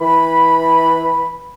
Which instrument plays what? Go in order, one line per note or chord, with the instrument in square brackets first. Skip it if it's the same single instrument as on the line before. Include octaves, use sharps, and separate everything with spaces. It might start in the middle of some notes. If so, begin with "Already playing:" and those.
[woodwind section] E3 B5